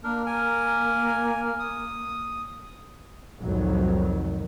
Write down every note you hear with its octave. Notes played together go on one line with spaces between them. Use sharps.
A#3 D4 A#4
A#4 G#5
D#6
C2 F2 A2 C3 D#3 F#3